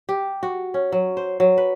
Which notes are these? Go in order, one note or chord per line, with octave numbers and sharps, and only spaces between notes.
G4
F#4
C#4
F#3
C5
F#3
B4